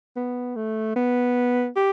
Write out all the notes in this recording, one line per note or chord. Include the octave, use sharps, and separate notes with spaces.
B3
A3
B3
G4